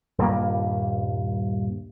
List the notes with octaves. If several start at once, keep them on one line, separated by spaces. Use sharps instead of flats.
D#1 G2 G3 A#3